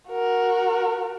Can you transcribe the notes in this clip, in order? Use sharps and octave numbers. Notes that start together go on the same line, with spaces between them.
F#4 A#4